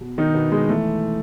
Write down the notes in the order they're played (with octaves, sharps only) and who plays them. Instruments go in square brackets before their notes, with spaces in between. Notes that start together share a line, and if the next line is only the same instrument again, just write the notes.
[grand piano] B2
D#3 D#4
B2 B3
G#3
E3 A3